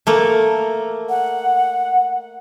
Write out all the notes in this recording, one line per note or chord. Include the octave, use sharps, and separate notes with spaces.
A3 A#3
F#5